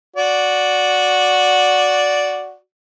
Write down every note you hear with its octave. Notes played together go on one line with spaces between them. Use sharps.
F#4 D5